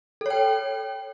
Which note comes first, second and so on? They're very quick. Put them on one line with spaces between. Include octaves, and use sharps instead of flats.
A4 C#5 G5